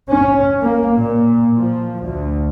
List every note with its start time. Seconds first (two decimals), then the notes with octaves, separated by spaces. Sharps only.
0.10 C#4
0.61 A#3
0.98 A#2
1.57 F3
2.02 D2